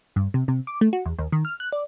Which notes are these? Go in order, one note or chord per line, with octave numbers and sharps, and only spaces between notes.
G2
C3
C3
D6
A3
F#4
E2
D#2
D#3
F6
F#6
D5